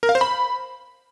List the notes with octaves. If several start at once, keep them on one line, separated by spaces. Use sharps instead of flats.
A#4
F5
C5
B5